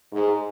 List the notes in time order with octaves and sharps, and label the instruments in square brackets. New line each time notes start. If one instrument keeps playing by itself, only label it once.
[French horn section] G#2